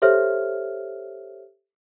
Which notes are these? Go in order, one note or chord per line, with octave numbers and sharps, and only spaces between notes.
G4 A4 C5 C#5 E5 F6